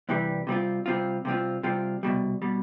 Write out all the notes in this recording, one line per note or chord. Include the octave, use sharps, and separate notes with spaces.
C2 C3 E3 G3
C3 G3 C4 F4
C3 G3 C4 F4
C3 G3 C4 F4
C3 G3 C4 F4
C2 B2 G3
B2 G3